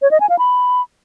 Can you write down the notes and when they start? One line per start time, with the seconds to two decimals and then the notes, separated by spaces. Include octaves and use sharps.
0.02 C#5
0.11 D#5
0.20 G#5
0.29 F5
0.38 B5